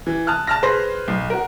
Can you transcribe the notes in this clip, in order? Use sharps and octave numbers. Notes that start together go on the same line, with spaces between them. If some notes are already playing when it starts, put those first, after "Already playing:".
E3
A5 D#6 F6 F#6
A5 F6 A#6
G#4 B4 C5 C6 A#6
B1
F#4 A#4